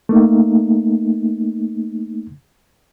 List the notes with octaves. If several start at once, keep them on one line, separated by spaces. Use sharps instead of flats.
A3 A#3 D#4